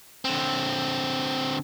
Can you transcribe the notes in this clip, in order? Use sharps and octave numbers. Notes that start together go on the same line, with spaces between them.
D3 C4